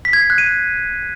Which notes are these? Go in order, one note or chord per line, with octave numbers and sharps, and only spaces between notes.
B6
G#6
C7
F#6
D#7